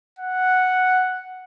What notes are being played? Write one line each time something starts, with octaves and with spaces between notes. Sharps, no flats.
F#5